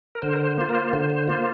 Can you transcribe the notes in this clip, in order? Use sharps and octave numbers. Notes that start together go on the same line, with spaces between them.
A#4
D3 C5
A#4
C5
A#3 F4 C5
A#4
C5
D3 C5
C5
A#3 F4 C5